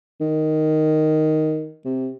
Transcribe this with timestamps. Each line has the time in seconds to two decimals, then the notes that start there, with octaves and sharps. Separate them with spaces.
0.21 D#3
1.85 C3